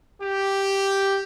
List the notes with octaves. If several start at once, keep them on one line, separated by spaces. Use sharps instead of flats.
G4